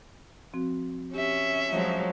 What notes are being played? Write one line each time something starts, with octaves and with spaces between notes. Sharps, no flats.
F3 C4 F#4
C#4 G4 E5
F3 F#3 G#3